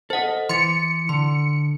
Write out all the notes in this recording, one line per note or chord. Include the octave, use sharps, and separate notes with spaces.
A4 C5 D#5 F#5
E3 C6 A6 C#7
D3 C6